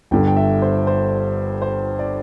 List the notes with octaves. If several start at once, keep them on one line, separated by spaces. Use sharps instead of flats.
G1 G2 D3 G5
G5
E5
C5
C5
C5
D5